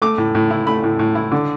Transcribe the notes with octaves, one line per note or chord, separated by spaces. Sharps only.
A3 D6
A2
A2
E4
A3 B5
A2
A2
E4
D3